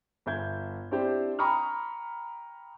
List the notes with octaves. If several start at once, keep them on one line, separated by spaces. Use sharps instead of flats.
G1 E5 G6 G#6
C4 D4 E4 G4 C5
G5 A#5 B5 C#6 D#6 F6